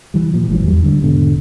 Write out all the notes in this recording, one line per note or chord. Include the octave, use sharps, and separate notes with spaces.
E3 G3
A#2 F3
G#1 G#2 E3 F#3
E2 G3
D3 G3
E1 G#2 B2 D3